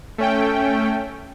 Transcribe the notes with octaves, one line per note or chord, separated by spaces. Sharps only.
A3 C#4 G5